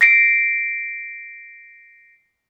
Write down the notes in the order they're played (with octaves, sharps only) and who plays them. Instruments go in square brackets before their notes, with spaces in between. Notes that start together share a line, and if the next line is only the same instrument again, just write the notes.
[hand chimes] A#6 C7 D7